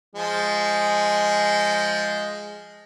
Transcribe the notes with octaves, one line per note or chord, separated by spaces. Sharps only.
F3 G#3 G#4